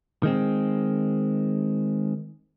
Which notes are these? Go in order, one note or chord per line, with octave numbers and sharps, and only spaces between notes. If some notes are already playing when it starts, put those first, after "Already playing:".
D#3 G#3 C4